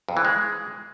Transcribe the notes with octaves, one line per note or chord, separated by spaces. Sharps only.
F2
E3
G#3